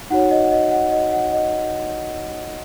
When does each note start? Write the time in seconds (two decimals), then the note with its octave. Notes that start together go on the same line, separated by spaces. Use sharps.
0.10 D#4 F#4 C#5 F#5
0.31 D#5
0.44 F#5
0.51 D#5
0.71 F#5
0.92 D#5
1.12 F#5
1.33 D#5